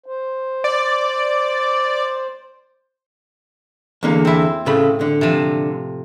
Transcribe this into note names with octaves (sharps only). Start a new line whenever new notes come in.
C5
D5
E2 D3 A#3
C4 E4
A2 C#3 A4 B5
D3
C3 F3